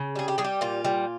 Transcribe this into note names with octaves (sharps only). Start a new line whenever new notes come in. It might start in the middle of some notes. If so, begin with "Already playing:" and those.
Already playing: C#3
G3 G#4
G4
G3 G#4
G4
A#2 F4
G3